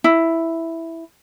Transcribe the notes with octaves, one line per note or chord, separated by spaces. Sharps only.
E4